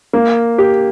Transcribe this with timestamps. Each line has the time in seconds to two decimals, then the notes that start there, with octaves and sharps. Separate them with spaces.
0.13 A#3
0.58 G4